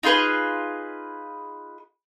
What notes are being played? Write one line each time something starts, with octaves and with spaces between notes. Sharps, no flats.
D#4 F4 G#4 B4